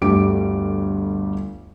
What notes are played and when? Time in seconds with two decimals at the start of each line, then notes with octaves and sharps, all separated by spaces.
0.01 G1 D2 G3 D6 D7